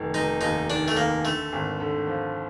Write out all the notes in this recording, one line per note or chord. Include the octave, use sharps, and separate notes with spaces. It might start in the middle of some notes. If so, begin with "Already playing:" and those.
Already playing: F1 D#3
F1 D#4
D#2 D#4
D#3 D4
A3
D#3 A#3
D3 A3
G#1
D3
F3